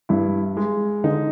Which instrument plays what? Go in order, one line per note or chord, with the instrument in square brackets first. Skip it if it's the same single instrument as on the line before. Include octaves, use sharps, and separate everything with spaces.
[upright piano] G2 [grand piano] E4
[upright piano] G#3
[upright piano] D3 [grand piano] D#4